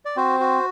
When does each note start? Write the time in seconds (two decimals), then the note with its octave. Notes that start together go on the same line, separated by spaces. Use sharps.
0.05 D5
0.16 C4 F#4 C5
0.40 F#4